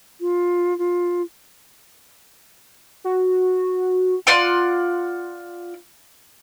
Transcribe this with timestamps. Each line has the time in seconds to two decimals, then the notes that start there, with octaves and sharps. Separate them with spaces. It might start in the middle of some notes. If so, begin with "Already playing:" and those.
0.21 F4
0.78 F4
3.04 F#4
4.27 F4 D5 F#5 C6